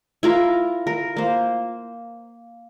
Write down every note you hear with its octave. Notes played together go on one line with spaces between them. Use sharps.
E4 F4 A#4
A#4
A#3 C5